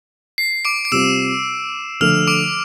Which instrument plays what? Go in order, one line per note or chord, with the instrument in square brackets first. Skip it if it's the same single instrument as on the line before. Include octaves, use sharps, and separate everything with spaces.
[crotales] C7
D6 D7
D7
[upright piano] C3 G3 C4 F4 [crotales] E6 E7
[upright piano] D3 F3 A3 [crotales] F6 F7
[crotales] D6 D7